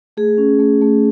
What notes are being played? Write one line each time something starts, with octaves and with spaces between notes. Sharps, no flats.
A3 G#4
C#4
A3
A3